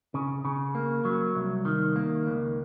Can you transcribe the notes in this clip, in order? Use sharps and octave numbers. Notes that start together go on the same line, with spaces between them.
C#3
C#3
A#3
F#3
C2
D#3
A#3
C#2